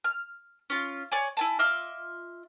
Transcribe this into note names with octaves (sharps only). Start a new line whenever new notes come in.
F6
C#4 F4
C#5 D5 G#5
E4 G#5 A5
F4 D#5 E5 D6